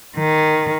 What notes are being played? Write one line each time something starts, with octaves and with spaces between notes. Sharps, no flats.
D#3